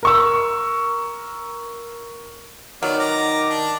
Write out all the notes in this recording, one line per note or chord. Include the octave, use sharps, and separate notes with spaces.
A#4 C#6 E6
D#3 F#3 B3 D5 F6
A#5 D6
D4